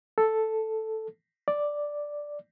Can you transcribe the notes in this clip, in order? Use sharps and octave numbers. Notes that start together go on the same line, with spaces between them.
A4
D5